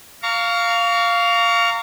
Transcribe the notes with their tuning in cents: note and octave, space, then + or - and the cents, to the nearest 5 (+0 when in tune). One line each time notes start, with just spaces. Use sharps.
F5 +0 A#5 -25 C#6 +35